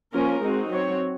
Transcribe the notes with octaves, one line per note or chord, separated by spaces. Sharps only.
F3 A#3 C#4 F4 A#4
G#3 C4 D#4 F#4
F#3 C4 F#4 C#5